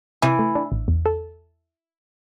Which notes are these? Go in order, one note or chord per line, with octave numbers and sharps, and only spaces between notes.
C3 E3
A3
D4
A1
E2
A4